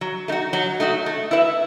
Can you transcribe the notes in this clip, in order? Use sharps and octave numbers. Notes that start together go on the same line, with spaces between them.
F#3
A3 D#4 F#4
F#3
A3 D#4 F#4
A3
E4 B4 E5